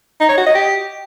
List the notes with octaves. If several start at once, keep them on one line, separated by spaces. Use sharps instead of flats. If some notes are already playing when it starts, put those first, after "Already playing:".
D#4
C#5
F#4
D#5
G4